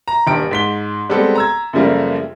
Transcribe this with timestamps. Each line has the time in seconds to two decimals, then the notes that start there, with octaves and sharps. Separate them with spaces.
0.08 A#5
0.27 D#1 G2 G4 D7
0.51 G#2 B6 G7
1.09 G3 G#3 B3 C4 G4 A4
1.35 A#5 E6 G#6
1.73 F#2 C#3 F3 G3 A3 A#3